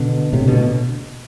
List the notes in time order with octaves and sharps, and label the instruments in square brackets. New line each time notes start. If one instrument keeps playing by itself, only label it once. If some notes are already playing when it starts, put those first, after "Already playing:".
Already playing: [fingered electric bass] B2 D3
A2 C3
B2 D3